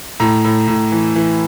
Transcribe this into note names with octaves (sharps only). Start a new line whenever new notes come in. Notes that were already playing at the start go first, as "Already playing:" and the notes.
A2 A#5
A2
A2
E3
E3